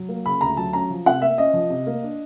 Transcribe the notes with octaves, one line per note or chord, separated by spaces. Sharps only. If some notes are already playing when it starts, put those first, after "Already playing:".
Already playing: F#3
A#3
C#3 B5
D2 A#5
F#3 A5
C#4 A#5
F3
C3 F#5
A#3 E5
C#4 D#5
F3
C3
A#3
D4